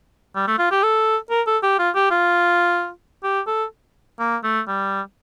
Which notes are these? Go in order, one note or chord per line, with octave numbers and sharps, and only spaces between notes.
G3
A3
F4
G4
A4
A#4
A4
G4
F4
G4
F4
G4
A4
A#3
A3
G3